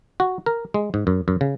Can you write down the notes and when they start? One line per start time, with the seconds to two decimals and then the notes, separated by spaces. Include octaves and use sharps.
0.20 F#4
0.46 A#4
0.74 G#3
0.94 G#2
1.07 F#2
1.28 F#2
1.41 C#3